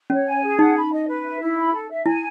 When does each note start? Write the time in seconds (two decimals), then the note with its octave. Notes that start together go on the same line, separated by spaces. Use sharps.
0.10 C#4 C#5
0.26 G#5
0.43 G#4
0.59 D#4 F#5
0.76 B5
0.92 D#5
1.08 B4
1.24 E5
1.41 E4
1.57 B5
1.73 A4
1.90 E5
2.06 E4 G#5